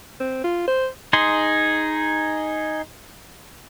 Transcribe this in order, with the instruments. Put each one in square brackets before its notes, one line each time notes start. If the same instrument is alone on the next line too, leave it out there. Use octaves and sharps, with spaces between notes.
[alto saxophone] C4
F4
C5
[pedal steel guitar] D#4 G#4 C6